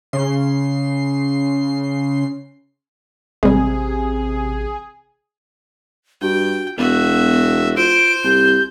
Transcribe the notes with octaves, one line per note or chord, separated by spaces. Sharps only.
C#3 C6 C7
A1 C3 G3 G#3 G#4
G2 F#4 G5
E1 B3 F#4 E5
F4 C5 D7
C2 G4 G6